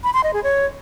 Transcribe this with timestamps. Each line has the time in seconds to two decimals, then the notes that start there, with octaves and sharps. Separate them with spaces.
0.04 B5
0.14 C6
0.23 D#5
0.33 G#4
0.43 C#5